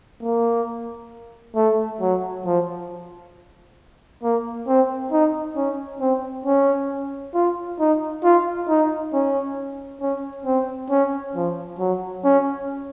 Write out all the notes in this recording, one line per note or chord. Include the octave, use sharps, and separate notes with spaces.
A#3
A3
F#3
F3
A#3
C4
D#4
C#4
C4
C#4
F4
D#4
F4
D#4
C#4
C#4
C4
C#4
F3
F#3
C#4